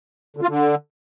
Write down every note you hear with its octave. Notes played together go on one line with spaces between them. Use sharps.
D3
F4
D3